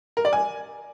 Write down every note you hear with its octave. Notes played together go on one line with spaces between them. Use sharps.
A#4
D5
G#5